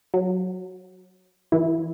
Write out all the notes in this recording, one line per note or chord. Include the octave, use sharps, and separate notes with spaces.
F#3
E3 E4